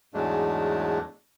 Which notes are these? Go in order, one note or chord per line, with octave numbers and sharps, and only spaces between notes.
E2 G#2 F#3 G#3 A3 D4